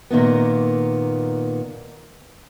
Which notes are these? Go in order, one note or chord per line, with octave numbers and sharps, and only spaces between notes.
F#2 A#2 D#3 A#3 B3